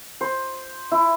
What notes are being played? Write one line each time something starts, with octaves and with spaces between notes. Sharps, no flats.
C5
E4